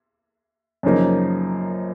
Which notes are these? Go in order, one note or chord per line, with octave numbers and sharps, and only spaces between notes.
F#2 C#3 F3 A#3 D#4